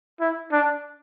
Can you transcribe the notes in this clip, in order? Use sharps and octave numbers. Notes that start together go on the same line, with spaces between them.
E4
D4